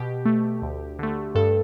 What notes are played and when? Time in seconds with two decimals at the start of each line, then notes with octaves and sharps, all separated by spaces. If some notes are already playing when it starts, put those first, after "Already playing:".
Already playing: B2 G4
0.25 A3
0.62 D2
0.99 D3 A3
1.35 G2 A4